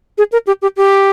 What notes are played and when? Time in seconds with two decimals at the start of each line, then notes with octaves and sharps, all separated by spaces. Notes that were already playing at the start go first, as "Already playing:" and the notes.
0.18 G#4
0.32 A#4
0.47 G4
0.62 G4
0.77 G4